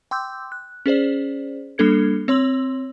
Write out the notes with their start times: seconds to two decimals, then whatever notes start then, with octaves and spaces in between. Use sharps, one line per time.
0.11 G5 C6 D6 E6 G6
0.52 F#6
0.86 C#4 G#4 C5 D5
1.78 G3 A#3 D4 A4 G#6 C#7
2.28 C4 C#5 C6 E6 F#7